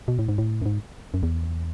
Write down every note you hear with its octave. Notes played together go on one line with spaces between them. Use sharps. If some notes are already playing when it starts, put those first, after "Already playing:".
B2
A2
G#2
A2
F#2
G#2
F#2
E2